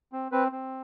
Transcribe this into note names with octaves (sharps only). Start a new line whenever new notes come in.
C4
C4 B4
C4